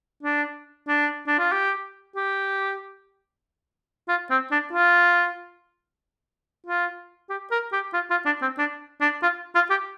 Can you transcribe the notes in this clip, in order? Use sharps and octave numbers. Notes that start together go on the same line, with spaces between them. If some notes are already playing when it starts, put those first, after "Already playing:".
D4
D4
D4
F4
G4
G4
F4
C4
D4
F4
F4
G4
A#4
G4
F4
F4
D4
C4
D4
D4
F4
F4
G4